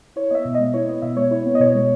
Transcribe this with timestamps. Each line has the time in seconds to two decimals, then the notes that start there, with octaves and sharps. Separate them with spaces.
0.16 E4 C#5
0.31 B3 D#5 E5
0.45 B2
0.55 G#3 D#5
0.74 E4 C#5
0.88 B3 D#5
1.02 B2 E5
1.17 G#3 C#5
1.31 E4 C#5
1.46 B3
1.55 D#5
1.60 B2 C#5
1.75 G#3